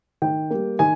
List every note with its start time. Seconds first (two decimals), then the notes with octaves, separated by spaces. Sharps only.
0.22 D#3 G5
0.50 G3 A#3
0.79 D#3 G#5